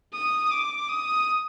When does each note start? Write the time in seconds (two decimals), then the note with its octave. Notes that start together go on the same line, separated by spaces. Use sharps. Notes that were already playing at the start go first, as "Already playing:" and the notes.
0.14 D#6
0.51 D6
0.89 D#6